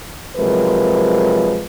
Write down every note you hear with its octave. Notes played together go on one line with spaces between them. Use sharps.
C3 F3 F#3 G#3 A#4 B4